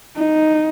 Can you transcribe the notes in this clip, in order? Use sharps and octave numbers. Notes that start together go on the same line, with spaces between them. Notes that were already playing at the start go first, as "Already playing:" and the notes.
D#4